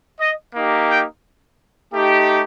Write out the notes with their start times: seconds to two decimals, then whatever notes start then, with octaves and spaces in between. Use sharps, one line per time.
0.20 D#5
0.55 A#3 D#4 G4
0.90 G5
1.93 A3 D#4 G4